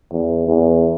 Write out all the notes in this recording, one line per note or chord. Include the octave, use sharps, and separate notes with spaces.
E2
E2